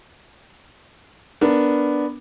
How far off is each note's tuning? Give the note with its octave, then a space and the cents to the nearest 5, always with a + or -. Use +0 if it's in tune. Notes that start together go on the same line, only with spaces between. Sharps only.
B3 +0 D4 +0 A#4 +0